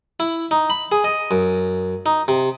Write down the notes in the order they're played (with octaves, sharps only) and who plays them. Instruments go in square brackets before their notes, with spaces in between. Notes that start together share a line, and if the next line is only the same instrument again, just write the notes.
[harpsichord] E4
D#4
B5
G#4
D#5
F#2
D#4
C3